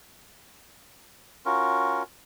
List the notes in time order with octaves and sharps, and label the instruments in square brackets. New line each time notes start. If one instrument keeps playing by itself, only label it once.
[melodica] C#4 F4 F#4 A#4